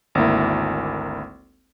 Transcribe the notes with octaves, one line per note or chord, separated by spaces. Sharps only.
G#1 D2 A#3 E4